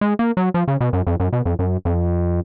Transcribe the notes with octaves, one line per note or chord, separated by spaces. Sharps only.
G#3
A#3
F#3
F3
C#3
B2
F#2
F2
F#2
B2
F2
F#2
F2